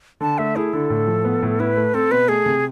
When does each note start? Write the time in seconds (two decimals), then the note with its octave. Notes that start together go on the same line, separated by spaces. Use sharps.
0.20 D3 A5
0.38 A3 E5
0.56 E4 G#4
0.73 D3 A4
0.90 A2
1.07 F3
1.25 B3
1.42 A2
1.60 E4 B4
1.77 A3
1.94 C4 A4
2.11 B2 B4
2.29 A3 G#4
2.46 C3